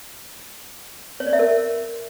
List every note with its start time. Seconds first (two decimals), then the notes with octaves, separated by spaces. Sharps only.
1.20 C#5
1.27 D5
1.33 E5
1.39 A#4